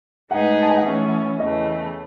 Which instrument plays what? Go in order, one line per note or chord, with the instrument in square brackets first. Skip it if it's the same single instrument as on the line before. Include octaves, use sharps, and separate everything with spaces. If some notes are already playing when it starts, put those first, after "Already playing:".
[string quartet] A2 G#3 D#4 G#4 B4 [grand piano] F#5
[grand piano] A5
G#5
F#5
[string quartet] E3 A3 C#4 [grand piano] E5
[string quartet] E2 C#3 E3 A3 [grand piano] D#5